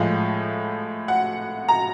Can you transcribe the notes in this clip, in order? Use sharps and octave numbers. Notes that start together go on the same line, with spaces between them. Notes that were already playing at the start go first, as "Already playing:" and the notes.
Already playing: A2 F3 G#3 F5
F#5
A#5